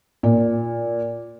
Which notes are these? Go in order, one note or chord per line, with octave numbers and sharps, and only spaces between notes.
A#2